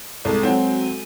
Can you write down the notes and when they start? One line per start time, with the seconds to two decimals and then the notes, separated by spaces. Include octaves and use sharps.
0.25 C2 G#3 A4
0.43 F#3 C4 F#4 G#5
0.81 D#7